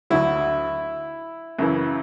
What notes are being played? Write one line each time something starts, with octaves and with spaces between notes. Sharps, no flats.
D2 D3 F#3 E4
F#2 C#3 E3